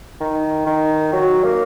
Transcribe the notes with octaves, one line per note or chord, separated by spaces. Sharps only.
D#3
D#3
F#3
A#3